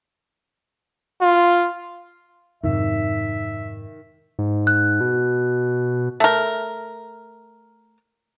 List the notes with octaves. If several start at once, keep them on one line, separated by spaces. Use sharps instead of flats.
F4
F2 G#2 C3 D#3 E5
G#2
F#6
B2
A3 A#4